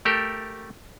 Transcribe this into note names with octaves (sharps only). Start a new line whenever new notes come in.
A3 G4 A4 A#4